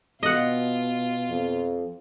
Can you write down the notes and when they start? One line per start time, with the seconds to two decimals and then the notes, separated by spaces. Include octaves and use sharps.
0.23 B2 F4 D#5 F#5
1.30 F2